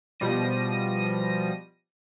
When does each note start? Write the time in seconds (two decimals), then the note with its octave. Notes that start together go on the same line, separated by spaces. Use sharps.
0.20 B2 F3 G3 A#6 D#7